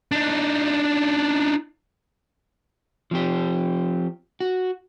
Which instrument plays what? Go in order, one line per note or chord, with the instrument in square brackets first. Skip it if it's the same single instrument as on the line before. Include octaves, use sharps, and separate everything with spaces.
[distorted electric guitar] D4 D#4
[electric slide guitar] F3 C4 G4
F#4